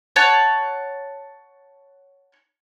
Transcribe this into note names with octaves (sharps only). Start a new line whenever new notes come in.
C#5 F#5 A5